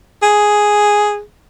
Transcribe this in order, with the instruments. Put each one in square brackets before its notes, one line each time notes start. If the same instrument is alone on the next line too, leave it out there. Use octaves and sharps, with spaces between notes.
[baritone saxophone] G#4